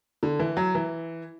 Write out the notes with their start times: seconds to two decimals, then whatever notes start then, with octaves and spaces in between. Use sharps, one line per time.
0.23 D3
0.39 E3
0.57 F#3
0.75 E3